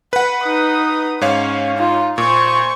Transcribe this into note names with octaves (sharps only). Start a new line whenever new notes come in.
B4 F#5 B5
D#4 D#6
G#2 C#4 C#5 F5
D#4 F4
A#2 C5 C#6